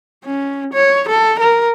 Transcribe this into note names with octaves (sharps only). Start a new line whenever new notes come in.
C#4
C#5
A4
A#4